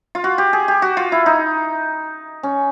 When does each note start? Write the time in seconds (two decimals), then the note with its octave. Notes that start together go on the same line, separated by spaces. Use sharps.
0.15 F4
0.24 F#4
0.38 G4
0.53 G#4
0.68 G4
0.82 F#4
0.97 F4
1.12 E4
1.26 D#4
2.43 C#4